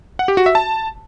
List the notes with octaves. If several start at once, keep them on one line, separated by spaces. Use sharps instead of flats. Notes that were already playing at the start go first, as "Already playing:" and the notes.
F#5
G4
F#4
E5
A5